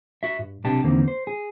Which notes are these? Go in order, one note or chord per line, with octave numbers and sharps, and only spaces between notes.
F#4 E5
G2
B1 C3 D4 G4 A5
E2 D3 D#3 A#3 C4
C5
G#4